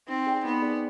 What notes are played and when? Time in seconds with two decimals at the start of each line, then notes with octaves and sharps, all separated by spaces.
0.08 C4 D#4
0.26 G#4 D5 G5
0.45 B3 D#4
0.62 G#4 D5 G5